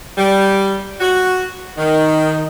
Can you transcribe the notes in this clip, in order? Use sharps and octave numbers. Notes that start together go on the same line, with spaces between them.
G3
F#4
D#3